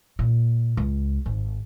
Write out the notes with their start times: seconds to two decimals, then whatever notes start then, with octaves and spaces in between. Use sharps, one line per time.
0.19 A#2
0.77 C#2
1.26 G#1